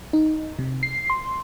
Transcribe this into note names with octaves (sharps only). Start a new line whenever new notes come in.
D#4
C3
C7
C6